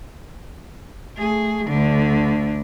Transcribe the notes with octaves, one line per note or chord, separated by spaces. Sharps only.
A3 G#4
D2 D3